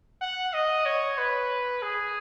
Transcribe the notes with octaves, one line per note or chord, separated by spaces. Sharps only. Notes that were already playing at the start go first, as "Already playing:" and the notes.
F#5
D#5
C#5
B4
G#4